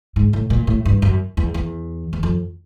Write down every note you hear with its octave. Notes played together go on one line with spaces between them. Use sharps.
G#2
A2
A#2
A2
G2
F#2
E2
E2
E2
F2